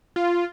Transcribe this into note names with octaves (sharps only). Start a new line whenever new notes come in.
F4